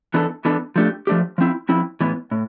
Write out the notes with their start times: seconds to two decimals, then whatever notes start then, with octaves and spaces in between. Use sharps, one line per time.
0.14 E3 B3 D4 A4
0.45 E3 B3 D4 A4
0.76 F3 A3 D4 G4
1.07 F3 A3 D4 G4
1.38 F3 C4 E4
1.69 F3 C4 E4
2.00 A2 E3 B3
2.31 A2